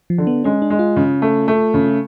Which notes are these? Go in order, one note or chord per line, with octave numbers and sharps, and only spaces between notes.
F3
D3
B3
G#3 C#4
D4
G#3
F4
C#3
A3
A3
C#3